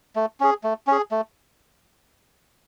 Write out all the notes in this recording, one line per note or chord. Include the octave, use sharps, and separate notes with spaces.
A3
C#4 G#4
A3
C#4 G#4
A3